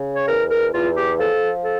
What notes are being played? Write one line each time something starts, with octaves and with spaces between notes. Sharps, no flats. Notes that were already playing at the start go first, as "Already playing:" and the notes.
Already playing: C#3
C#5
E2 A#4
A#4
E2 F4
G4
F3 A4
A4